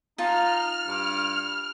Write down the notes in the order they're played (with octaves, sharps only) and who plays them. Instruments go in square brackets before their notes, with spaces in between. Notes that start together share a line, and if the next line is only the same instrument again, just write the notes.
[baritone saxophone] D#4 [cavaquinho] F4 A5 [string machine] F6
[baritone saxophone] G2